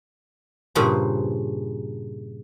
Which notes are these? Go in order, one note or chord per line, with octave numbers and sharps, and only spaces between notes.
G2 A#2 C#3 G#4 B4 C5